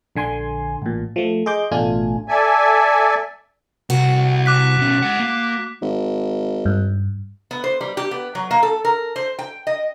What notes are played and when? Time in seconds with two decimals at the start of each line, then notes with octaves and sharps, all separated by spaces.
0.16 A#1 D3 G#5 C6
0.82 A1 A#2
1.16 F3 A3
1.46 G#4 D#5 C6 D6 G6
1.71 A1 B2 A3 D4 F4 G#5
2.28 A4 D5 E5 G#5
3.90 C2 F#4
4.46 D6 F#6 B6
4.78 B2 C#4
5.03 G#3 F#5
5.20 A#3
5.82 G#1
6.65 G2
7.51 B3
7.64 C5
7.81 G3
7.97 G4
8.11 B3
8.35 F#3
8.51 A#3
8.63 A4
8.85 A#4
9.16 C5
9.39 G5
9.67 D#5